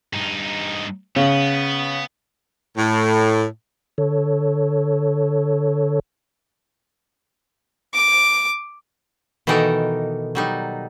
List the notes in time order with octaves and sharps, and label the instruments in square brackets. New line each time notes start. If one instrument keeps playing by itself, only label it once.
[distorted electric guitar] G2 D#4
[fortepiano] C#3 [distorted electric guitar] B3
[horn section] A2
[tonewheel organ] D3 A4 C#5
[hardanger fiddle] D6
[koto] B2 D#3 E3 D#4 A4 A#4
F#3 G3 D#4